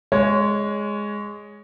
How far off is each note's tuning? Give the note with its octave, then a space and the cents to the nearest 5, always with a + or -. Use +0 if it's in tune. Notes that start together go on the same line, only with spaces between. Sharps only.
G#3 +0 C#5 +15